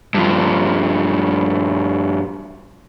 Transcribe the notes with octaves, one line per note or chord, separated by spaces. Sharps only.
G2 F3